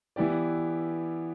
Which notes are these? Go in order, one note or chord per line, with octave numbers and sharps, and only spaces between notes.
E3 B3 E4 G4 D5